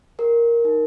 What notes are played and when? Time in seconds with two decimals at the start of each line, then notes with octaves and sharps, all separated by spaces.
0.19 G4 A#4
0.65 D#4